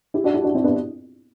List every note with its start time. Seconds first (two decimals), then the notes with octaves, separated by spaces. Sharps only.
0.14 E4 G4
0.24 D4 F#4
0.34 E4 G4
0.44 D4 F#4
0.55 C4 E4
0.64 B3 D4